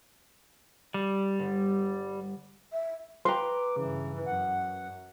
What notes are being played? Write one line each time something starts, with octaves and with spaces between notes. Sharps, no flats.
G3
G1
E5
B4 G5 A#5 C6 D6
G2 C#3 E3
F#2 F#5